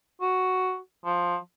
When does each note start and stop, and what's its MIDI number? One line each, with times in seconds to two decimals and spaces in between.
0.21 0.77 66
1.05 1.36 53